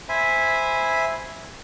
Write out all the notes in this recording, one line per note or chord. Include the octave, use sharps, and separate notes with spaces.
C5 E5 G#5 B5